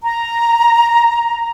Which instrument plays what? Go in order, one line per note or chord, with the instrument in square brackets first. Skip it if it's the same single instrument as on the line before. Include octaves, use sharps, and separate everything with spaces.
[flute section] A#5